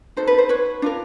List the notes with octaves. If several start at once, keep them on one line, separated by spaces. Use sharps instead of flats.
D#4 F#4 A4 C5
B4
C5
B4 C#5
D4 F4 A#4